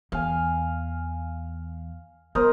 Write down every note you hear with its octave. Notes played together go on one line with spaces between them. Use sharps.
E2 F5 G#5
B3 A#4 C5 D#5